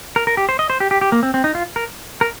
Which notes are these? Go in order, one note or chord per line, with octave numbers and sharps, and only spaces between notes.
A#4
A#4
G4
C5
D#5
C5
G4
G4
G4
A#3
C4
C4
D#4
F4
A#4
A#4